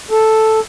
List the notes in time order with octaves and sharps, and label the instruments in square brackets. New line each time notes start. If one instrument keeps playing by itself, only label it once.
[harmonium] A4